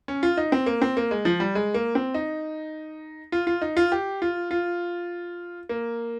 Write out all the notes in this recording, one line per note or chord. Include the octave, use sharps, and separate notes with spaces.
C#4
F4
D#4
C4
A#3
C4
A#3
G#3
F3
G3
G#3
A#3
C4
D#4
F4
F4
D#4
F4
G4
F4
F4
A#3